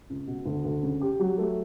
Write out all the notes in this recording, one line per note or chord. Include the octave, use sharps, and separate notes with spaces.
C#2
B2
D2
D2
C#3
G4
F#3
A3